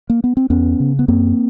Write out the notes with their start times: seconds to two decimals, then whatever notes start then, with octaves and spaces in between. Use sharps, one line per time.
0.10 A#3
0.24 B3
0.37 C4
0.50 E2 B3 C#4
0.80 C#3
0.99 B3
1.08 F#2 A#3 C4